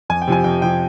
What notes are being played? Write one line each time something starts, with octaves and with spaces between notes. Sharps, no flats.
F2 G#5
G5
C3 F3 G#5
F2 G5
C3 F3 G5